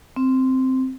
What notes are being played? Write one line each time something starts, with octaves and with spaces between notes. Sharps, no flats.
C4